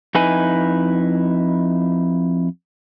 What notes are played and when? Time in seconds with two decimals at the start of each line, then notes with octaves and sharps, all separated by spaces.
0.15 F2 D#4 E4 B4 G#5